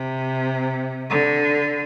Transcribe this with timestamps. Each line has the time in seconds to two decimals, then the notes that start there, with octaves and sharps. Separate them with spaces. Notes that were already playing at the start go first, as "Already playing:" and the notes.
Already playing: C3
1.10 D3